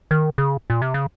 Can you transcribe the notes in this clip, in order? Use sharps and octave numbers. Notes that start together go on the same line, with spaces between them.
D#3
C#3
A#2
C3
C#3